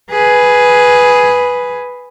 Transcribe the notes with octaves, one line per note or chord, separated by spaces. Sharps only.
G#4 B4